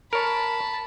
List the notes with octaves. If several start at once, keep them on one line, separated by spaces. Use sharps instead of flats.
A#4 C#5 A5 B5